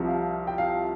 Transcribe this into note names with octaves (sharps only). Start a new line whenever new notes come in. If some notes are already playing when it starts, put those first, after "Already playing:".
Already playing: C2 C3 F3
F5
G5
F5